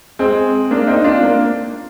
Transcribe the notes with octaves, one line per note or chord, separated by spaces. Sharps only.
G#3 C4
A#3 D4
C4 D#4
D4 F4
A#3